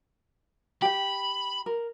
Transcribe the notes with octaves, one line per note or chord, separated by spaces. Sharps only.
G4 G5 B5
A#4